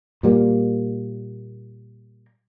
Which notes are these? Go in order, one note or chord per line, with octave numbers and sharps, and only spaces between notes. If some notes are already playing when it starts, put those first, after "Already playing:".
A#2 G3 A#3